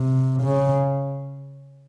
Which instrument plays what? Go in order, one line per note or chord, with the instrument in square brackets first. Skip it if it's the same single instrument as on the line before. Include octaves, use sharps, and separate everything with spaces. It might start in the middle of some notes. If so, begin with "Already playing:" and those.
Already playing: [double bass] C3
C#3